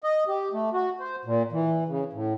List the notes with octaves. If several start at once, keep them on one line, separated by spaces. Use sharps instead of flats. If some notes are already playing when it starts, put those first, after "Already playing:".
D#5
G4
A3
F#4
C5
A#2
E3
C#3
A2